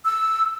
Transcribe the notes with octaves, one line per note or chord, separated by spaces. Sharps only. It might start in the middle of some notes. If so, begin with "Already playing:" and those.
E6